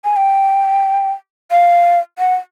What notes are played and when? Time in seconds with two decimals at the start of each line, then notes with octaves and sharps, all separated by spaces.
0.05 G#5
0.16 G5
1.51 F5
2.19 F#5